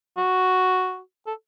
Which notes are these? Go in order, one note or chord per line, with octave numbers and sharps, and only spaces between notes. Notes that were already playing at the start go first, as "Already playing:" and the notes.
F#4
A4